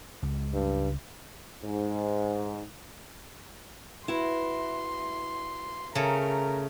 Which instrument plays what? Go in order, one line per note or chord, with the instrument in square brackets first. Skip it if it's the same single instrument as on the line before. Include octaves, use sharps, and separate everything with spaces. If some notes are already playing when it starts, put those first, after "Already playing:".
[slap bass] C#2 G#3
[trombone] G2
[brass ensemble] G#2
[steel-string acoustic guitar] E4 F#4 B4 [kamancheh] C6
[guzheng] C#3 A3 [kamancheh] A#4 A#5